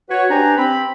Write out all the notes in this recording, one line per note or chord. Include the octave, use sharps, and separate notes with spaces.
F#4 B4 C#5
D4 G4 B4 C5 G#5 A#5
C4 B5